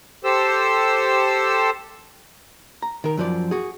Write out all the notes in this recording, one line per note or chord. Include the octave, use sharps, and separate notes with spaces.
G4 A4 C5 E6
A#5
D#3 A#4
F#2 F3 D5
F#4 G#4